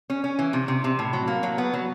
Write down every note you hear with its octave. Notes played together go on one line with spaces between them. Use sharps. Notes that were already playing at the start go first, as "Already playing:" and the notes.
C#4
C#4
E3
C3
C3
C3
A2
F#3
A#3
F#3
B3
F#3